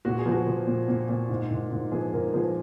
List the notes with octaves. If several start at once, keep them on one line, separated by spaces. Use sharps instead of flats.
A#2 F#4
G#4
F3
F#4
F3
A#2
A#2
A#2
G#2
G#2
G#2
F3 G#4
G#2 A#4
F3 G#4